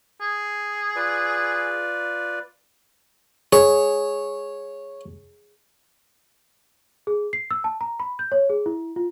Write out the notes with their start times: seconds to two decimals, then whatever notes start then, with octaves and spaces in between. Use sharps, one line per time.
0.20 G#4
0.96 F4 B4 D5
3.53 G#4 C#5
7.07 G#4
7.33 C7
7.51 E6
7.64 A5
7.81 A#5
8.00 B5
8.19 G6
8.32 C#5
8.50 G#4
8.66 E4
8.96 F4